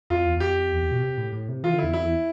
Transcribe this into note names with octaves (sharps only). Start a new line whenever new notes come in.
F2 F4
E2
E2
F2 G4
E2
E2
B2
C3
A2
A2
C3
E3 F4
D3
E4
E2
F2 E4
E2